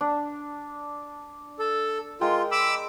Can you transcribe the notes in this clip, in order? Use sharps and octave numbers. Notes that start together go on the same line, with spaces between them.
D4
A4
G#3 F4 A#4 G5
B5 D6 E6